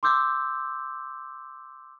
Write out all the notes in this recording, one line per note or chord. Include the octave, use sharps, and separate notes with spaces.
C6 D6 E6 G6